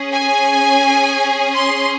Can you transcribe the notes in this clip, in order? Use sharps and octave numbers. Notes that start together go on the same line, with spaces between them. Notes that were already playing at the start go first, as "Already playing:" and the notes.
Already playing: C#4 G#4
G#5
C6